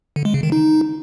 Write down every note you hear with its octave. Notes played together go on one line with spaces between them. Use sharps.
D3
G#3
C#3
D#3
D#4